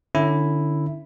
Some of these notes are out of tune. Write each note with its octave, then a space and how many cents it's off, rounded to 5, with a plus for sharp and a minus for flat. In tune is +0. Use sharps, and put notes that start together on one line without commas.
D3 +20 C#4 +0 E4 +0